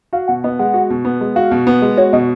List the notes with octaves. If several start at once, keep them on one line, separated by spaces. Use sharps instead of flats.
F#4 F5
B2 F#5
B3 D#5
G#3 F#5
F#4
B2
B3
G#3
F#4 F5
B2
B3
G#3
F#4 C#5
B2 D#5